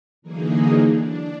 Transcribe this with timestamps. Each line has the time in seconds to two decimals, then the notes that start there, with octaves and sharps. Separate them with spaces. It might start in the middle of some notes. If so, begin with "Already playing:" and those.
0.22 D3 E3 F#3 A#3 D#4 G#4
0.82 D4